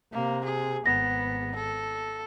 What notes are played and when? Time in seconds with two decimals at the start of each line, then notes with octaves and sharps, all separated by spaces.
0.13 C3 A#3
0.44 G#4
0.86 G#1 B3 A#6
1.55 A4